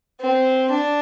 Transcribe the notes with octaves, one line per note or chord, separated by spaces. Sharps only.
C4
D4